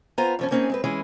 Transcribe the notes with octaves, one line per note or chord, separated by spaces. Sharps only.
B3 F4 C5 G#5 A#5
F#2 F3 C#4
A#3 C4 C#4 D#4 E4 G#4
G#3 C4 B4
E3 G#3 C#4 E4 G#4